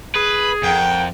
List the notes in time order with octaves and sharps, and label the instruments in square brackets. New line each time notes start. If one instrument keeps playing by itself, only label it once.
[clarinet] G#4 [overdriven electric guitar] B4
[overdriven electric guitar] F2 [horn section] A#4 F#5 G5